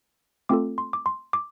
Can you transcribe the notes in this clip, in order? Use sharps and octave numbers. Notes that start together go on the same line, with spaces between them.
A3 C4 F4 A4 D6
C6
D6
C6
D6